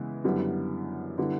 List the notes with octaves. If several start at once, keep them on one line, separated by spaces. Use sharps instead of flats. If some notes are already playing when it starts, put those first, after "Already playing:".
Already playing: C#3 E3 G#3 B3 E4
F#2 D3 G3 B3 E4
D3 G3 B3 E4